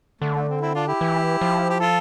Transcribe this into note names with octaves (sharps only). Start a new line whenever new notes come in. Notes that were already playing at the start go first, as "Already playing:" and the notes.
D3 A3
A3
C4
C4 E4
D4 F4
E4 G4
E3
F3
G4
F4 A4